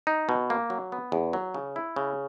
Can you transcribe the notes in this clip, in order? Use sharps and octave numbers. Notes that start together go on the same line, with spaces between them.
D#4
B2
A#3
F#3
B3
E2
F#3
C#3
E4
C#3